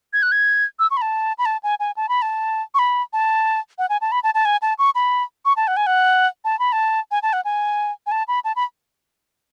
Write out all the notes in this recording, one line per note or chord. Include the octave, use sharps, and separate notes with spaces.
G#6
F#6
G#6
E6
C#6
B5
A5
B5
A5
G#5
G#5
A5
B5
A5
C#6
B5
A5
F#5
G#5
A5
B5
A5
A5
G#5
A5
C#6
B5
C#6
A5
F#5
G#5
F#5
A5
B5
A5
G#5
A5
F#5
G#5
G#5
A5
B5
A5
B5